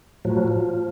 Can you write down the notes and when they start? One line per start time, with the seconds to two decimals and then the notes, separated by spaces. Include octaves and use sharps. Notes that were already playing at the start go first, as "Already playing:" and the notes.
0.25 A2 F3 F#3
0.48 F3